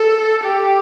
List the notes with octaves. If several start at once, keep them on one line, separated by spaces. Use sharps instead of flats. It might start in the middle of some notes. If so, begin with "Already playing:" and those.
Already playing: A4
G4